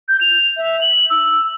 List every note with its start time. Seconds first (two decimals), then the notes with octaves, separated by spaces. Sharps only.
0.09 G6
0.21 F7
0.57 E5
0.81 F#7
1.10 E6